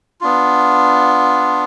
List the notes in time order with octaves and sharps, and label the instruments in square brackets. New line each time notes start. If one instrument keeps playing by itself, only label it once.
[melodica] B3 D4 F4